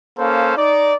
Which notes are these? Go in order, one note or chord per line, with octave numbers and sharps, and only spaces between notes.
A#3 C#4 A4 C5 F5
D#4 D5